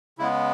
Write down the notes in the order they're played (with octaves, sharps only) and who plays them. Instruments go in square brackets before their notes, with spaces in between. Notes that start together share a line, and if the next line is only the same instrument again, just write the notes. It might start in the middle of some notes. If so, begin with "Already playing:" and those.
[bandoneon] C#3 G#3 B3 E4